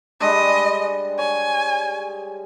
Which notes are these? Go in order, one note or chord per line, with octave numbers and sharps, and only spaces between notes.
G3 G#3 D4 D#5
C#5 G#5